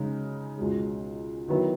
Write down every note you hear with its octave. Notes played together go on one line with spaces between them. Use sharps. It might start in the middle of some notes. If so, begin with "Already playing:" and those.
Already playing: C#3 G#3 D#4
C#2 B2 G#3
D#3 F#3 B3 E4